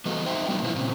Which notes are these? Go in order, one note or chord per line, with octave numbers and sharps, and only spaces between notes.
E3 G3 B3 F#4 A4 D#5
D#4 C5 E5 G5
F#3 G3 A3 B3 D4
B2 F3 G#3 C#4 E4
A#2 C#3 C4 C#4